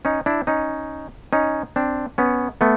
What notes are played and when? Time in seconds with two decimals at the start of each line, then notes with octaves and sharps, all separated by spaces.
0.05 C#4 D#4
0.26 D4 E4
0.47 C#4 D#4
1.33 C#4 D#4
1.76 C4 D4
2.18 B3 C#4
2.61 A3 B3